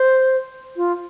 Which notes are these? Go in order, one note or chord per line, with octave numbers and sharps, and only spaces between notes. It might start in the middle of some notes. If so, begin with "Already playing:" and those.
Already playing: C5
F4